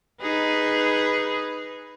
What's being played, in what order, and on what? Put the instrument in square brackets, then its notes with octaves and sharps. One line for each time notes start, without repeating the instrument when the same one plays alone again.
[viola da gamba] D#4 G#4 B4